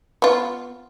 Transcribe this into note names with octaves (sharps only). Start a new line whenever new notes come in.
B3 F4